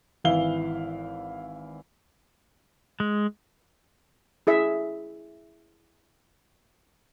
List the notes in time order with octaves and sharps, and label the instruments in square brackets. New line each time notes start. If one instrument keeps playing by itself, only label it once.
[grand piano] G#1 E3 E4 F5 G7
[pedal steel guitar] G#3
[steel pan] E4 G#4 E5